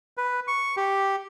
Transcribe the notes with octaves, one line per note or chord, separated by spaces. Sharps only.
B4
C#6
G4